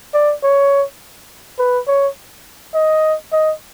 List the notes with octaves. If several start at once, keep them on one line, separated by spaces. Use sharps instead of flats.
D5
C#5
B4
C#5
D#5
D#5